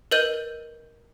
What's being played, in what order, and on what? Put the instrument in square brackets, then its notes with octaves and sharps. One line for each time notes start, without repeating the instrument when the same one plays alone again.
[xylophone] A#4 B4 D#5 G6 D#7